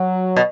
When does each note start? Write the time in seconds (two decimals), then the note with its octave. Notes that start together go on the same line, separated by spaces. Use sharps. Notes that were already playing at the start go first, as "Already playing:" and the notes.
Already playing: F#3
0.36 B2